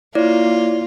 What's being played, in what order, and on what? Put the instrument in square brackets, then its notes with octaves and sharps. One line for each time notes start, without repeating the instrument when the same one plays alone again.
[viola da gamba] A#3 F4 [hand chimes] E4 C#5 D5